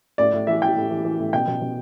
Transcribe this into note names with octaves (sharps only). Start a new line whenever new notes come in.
A2 D5
A2
E3 E5
E3 G5
A2
E3
E3
A2
B2 G5
B2
B2